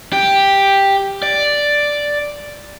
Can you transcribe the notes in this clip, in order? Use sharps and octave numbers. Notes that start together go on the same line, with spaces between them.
G4
D5